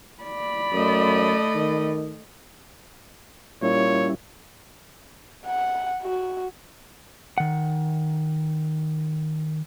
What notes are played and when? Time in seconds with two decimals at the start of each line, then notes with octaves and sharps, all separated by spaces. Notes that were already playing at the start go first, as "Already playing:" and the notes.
0.23 D5 B5
0.73 F#2 A3 D#5
1.55 D#3
3.62 A#2 G3 C#4 E4 C#5
5.47 F#5
6.02 F#4
7.38 D#3 F#5